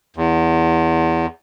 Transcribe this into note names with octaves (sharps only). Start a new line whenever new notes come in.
E2